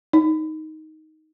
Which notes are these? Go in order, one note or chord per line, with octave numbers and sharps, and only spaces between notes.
D#4